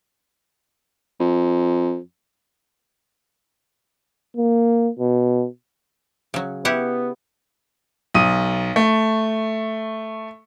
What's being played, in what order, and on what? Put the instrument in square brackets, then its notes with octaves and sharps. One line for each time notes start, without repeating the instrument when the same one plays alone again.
[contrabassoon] F2
[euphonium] A#3
B2
[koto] C#3 F#3
[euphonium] B3 [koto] E4 G4 F#5
[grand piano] B1 D#6 D#7
A3